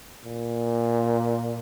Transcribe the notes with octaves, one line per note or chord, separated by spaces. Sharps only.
A#2